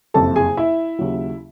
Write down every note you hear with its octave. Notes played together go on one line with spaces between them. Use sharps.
F#1 F2 C3 A4 A5
G#4 G#5
E4 E5
D#2 C#3 F#3